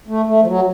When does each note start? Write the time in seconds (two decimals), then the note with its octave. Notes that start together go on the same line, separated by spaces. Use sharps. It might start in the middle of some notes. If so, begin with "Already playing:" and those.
0.08 A3
0.27 A3
0.42 F3
0.47 F#3